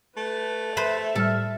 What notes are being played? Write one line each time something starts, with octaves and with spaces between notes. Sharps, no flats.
A3 B4
B4 C5 E5 B5
A2 G3 A4 F6